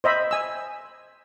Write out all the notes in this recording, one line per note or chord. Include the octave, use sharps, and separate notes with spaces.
C5 D#5 E5 B5
G#5 E6